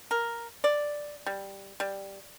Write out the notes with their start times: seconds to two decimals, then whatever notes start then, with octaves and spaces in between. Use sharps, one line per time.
0.11 A#4
0.64 D5
1.26 G3
1.80 G3